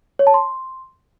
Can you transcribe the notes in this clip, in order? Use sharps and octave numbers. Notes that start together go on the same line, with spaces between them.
C#5
A5
C6